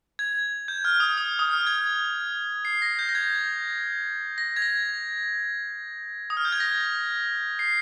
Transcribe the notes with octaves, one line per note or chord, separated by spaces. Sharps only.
G#6
G6
F6
D#6
D#6
D#6
F6
G#6
C7
A#6
G6
A#6
G#6
A#6
G#6
A#6
D#6
F6
G6
G#6
A#6
C7